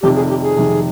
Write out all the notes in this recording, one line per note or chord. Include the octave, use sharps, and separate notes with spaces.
F1 F2 C3 D#3 G4
G#4
G4
G#4
F1 F2 C3 D#3